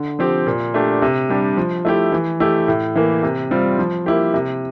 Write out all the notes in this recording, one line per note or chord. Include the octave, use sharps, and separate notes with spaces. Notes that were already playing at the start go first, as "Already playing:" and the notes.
Already playing: D3
F3 C4 G4
A#2
A3 D4 G4
C3
G3 D4 G4
F3
A3 E4 G4
E3
A3 E4 G4
A2
E3 A#3
C3
G3 C4 F4
F3
A#3 E4 G4
C3